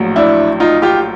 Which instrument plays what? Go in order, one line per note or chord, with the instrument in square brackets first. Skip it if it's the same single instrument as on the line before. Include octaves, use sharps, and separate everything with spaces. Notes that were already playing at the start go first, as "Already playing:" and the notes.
Already playing: [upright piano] A#1 A2 F#3
D4 E4
D#4 F4
F4 G4